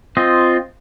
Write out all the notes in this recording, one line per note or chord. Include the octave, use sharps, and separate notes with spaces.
C4 F4 D#5